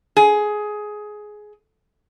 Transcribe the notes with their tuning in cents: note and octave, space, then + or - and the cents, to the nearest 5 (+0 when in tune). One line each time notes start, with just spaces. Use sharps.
G#4 +15